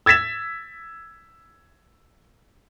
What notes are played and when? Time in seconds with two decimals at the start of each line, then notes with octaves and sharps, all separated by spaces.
0.06 E6 G#6 A6 B6 E7